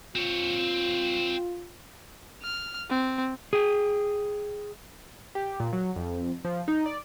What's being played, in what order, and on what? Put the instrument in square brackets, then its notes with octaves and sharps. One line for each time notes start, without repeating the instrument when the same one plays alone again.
[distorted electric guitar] C4 C#5 [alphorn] F4
[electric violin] F6
C4
[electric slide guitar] G#4 G5
[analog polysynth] G4
A#2
F#3
F2
F3
D#4
D5